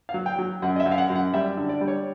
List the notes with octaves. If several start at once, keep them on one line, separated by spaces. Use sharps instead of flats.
F5
F#3
G5
F#3
F#2 F#5
D#5
E5
F#2
F5
F#5
F#2
F#5
G3 E5
D3
D5
G3
C#5